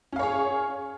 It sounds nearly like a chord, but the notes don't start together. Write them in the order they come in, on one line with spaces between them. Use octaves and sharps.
C#4 F5 C#5 G#4